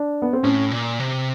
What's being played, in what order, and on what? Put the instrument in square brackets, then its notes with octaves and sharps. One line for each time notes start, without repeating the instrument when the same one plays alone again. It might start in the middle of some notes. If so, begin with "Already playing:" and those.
Already playing: [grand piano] D4
B3
C4
[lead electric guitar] A2 [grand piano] C#4
[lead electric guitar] A#2
C3